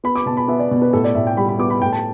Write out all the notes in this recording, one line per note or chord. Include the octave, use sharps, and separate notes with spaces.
B3 B5
D6
B2 A5
B5
B3 E5
D5
B2
B4
A2 A4
D5
A2 E5
G5
G3 B5
B5
B3 D6
B5
A2 G5
A5